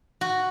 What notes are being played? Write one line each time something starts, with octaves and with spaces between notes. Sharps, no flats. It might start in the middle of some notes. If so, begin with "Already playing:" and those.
F#4